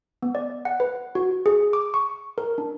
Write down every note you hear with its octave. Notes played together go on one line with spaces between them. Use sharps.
B3
D5
F#5
B4
F#4
G#4
D6
C#6
A#4
D4